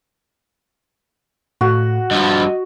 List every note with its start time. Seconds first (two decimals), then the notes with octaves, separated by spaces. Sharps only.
1.61 A2 F#4
2.11 G2 F3 D#5